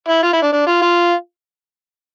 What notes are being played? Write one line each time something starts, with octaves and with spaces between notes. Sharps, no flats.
E4
F4
E4
D4
D4
F4
F4